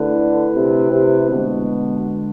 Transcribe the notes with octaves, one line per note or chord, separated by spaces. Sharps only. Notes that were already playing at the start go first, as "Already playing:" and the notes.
Already playing: D3 A3 E4 B4
C3
C3
B2 D3 G#3 D4